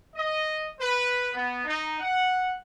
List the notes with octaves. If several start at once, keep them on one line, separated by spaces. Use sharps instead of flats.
D#5
B4
B3
D#4
F#5